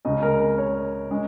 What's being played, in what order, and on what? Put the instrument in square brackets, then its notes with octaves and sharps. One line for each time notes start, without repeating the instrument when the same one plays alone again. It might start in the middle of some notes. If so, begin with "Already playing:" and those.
[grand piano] C#2 C#3 G#3 C#4 [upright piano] D#5
[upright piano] A#4
A#4
C#5
[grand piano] G#3 C#4